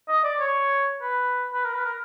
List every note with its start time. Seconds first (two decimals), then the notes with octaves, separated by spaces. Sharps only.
0.09 D#5
0.24 D5
0.40 C#5
1.02 B4
1.53 B4
1.64 A#4
1.74 B4
1.85 A#4